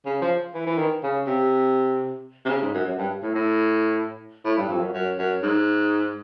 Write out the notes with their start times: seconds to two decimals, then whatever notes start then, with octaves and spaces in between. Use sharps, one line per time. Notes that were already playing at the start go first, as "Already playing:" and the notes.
0.05 C#3
0.21 F3
0.54 E3
0.66 E3
0.78 D#3
1.03 C#3
1.27 C3
2.45 C3
2.49 C#3
2.62 G#2
2.74 F#2
2.86 F#2
2.98 G2
3.22 A2
3.35 A2
4.45 A2
4.57 G2
4.69 F2
4.81 F#2
4.93 F#2
5.18 F#2
5.43 G#2